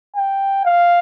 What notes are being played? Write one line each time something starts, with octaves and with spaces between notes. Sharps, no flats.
G5
F5